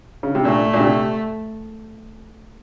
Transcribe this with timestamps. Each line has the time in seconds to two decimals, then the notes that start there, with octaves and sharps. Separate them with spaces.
0.23 C#3
0.35 C3
0.45 A#2 A3
0.73 A#2
0.80 C3